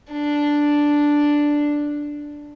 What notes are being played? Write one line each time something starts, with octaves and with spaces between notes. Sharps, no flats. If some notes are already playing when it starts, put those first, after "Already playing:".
D4